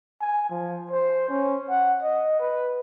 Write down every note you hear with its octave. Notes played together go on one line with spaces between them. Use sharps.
G#5
F3
C5
C#4
F#5
D#5
B4